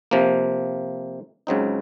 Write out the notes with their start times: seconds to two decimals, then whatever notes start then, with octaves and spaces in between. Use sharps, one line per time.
0.11 C3 F3 A#3
1.47 C#2 C#3 F#3 C4 D#4